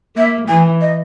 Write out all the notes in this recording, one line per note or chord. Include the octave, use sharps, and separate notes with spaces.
A#3 E5
E3 G#5
D#5